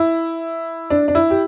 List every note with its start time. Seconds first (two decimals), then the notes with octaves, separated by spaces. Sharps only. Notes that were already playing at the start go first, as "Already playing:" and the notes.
Already playing: E4
0.90 D4
1.08 D4
1.15 E4
1.30 G4